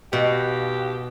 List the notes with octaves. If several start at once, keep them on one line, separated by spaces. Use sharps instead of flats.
B2 G4